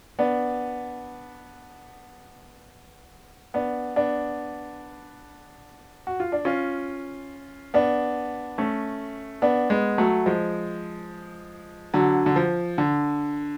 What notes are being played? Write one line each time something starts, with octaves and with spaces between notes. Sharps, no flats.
B3 D4
B3 D4
B3 D4
F#4
F4
D4
C#4 F4
B3 D4
A3 C#4
B3 D4
G#3 B3
F#3 A3
F3 G#3
D3 F#3
D3
F3
D3